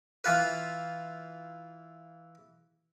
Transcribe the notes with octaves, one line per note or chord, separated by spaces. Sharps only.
E3 F4 B4